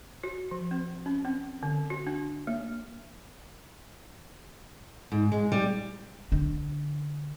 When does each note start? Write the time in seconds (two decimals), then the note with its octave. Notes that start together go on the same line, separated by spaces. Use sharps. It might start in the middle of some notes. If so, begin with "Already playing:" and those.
0.23 F#4
0.51 F3
0.71 C4
1.06 C#4
1.25 C4
1.63 D3
1.90 F#4
2.07 D4
2.47 A#3
5.12 G#2
5.32 G#3
5.52 G3
6.32 D3